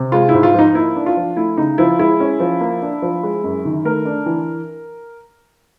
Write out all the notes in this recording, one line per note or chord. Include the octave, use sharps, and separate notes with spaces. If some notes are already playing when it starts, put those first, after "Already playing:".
Already playing: C3
G#3 F4
G#2 E4
F4
F3 D#4
A#3 E4
D4
F4
F3
A3 E4
C#3 D#4
F3 E4
G#3 E4
C#4
F3
A#3
D4
F3
G#3
F#2
D#3
A3 A#4
D4
E3